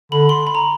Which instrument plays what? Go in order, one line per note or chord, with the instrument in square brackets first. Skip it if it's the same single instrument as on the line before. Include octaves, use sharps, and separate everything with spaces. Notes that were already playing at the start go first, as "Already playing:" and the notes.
[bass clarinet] D3 [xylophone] B5
[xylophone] C6
B5
A#5